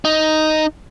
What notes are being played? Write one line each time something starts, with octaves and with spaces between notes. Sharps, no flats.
D#4